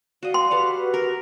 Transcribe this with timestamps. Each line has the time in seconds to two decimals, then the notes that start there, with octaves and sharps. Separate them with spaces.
0.23 F#4 D5 D#5 F5
0.34 C6
0.51 F#4 G4 A4 B4 F5 F#5
0.94 A#4